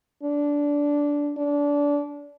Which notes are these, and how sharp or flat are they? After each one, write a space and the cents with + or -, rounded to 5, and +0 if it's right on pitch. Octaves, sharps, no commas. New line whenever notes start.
D4 -15
D4 -25